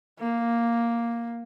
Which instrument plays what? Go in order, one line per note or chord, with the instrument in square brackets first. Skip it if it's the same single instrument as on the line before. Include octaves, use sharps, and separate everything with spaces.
[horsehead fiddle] A#3